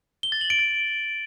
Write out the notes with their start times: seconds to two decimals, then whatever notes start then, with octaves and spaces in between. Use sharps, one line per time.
0.23 G7
0.32 A6
0.41 F#7
0.50 D7
0.59 A6